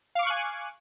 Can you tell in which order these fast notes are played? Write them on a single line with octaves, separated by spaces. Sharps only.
F5 D6 C#6 F#6 G#5